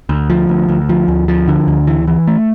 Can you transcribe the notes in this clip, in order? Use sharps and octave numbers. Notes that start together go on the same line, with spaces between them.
D2
F3
D2
D2
F3
D2
F3
D3
D2
E3
E3
A3